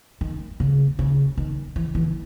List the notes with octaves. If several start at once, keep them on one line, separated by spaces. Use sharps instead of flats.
D#3
C#3
C#3
D#3
E3
E3